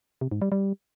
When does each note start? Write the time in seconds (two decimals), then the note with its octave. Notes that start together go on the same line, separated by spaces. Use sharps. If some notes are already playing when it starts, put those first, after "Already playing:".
0.21 C3
0.31 G#2
0.42 G3
0.52 G3